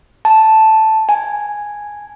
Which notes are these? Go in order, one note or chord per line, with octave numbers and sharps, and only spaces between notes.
A5
G#5